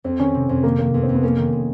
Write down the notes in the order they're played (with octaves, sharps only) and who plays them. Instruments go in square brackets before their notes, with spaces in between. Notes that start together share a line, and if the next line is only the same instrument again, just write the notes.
[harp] F2 [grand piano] C4
[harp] D#3 [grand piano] C#4
[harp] C3
[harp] F2 [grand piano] C4
[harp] D#3 [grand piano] A#3
[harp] D#3 [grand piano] A#3
[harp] F2 [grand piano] B3
[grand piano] C4
[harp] F2
[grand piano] B3
[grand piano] A#3 [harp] C#4
[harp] D#3
G#3